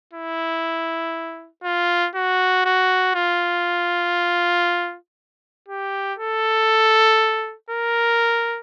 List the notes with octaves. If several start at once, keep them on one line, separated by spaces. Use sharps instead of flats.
E4
F4
F#4
F#4
F4
G4
A4
A#4